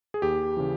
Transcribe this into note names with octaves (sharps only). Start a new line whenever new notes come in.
G#4
D#2 G4
C#3 E3